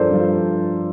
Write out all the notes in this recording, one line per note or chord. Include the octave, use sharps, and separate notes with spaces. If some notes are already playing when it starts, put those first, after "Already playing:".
Already playing: G2 F3 A4 A#4 C5 D5
G2 F3